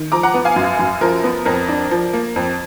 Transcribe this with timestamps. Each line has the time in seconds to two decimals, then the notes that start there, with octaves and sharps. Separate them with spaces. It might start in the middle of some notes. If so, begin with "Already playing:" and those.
Already playing: D#3
0.12 F3 A#5 D6
0.23 F#5 A#5
0.34 B3
0.45 F5 G#5
0.56 F#2
0.79 F#2
1.01 F3 A#4
1.24 B3
1.45 F2 A#4
1.68 D4
1.91 F3
2.13 A#3
2.36 F2